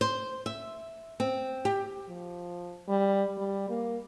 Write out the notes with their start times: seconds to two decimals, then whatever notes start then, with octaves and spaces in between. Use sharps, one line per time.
0.01 C5
0.46 E5
1.20 C4
1.65 G4
2.09 F3
2.89 G3
3.38 G3
3.70 A#3